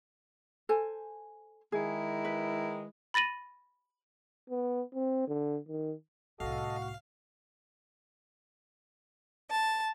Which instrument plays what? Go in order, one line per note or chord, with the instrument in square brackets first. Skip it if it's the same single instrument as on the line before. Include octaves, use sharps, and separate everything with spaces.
[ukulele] A4 C5 G#5
[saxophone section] D#3 G#3 E4 [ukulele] G#4
[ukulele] B4
[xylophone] B5 A6 A#6 D#7 F#7
[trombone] B3
C4
D3
D#3
[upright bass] C2 A2 [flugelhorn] F#4 [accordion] A4 D#5 [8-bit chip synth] F5
[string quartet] A5